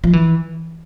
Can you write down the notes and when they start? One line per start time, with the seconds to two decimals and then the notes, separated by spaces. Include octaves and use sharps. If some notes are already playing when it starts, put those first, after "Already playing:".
0.04 F3
0.13 E3